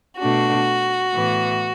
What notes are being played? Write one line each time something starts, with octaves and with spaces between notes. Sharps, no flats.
B2 A3 D4 F#4
A2 E3 B3